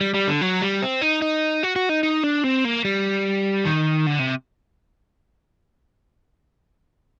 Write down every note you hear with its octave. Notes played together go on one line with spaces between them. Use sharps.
G3
G3
D3
F#3
G3
C4
D#4
D#4
F#4
F#4
D#4
D#4
D4
C4
A#3
G3
D#3
D3
C3